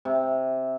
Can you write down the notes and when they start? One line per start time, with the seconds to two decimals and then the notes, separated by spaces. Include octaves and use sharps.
0.05 C3